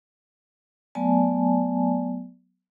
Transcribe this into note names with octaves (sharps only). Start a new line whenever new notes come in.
F#3 A3 B3 D5 G#5 A5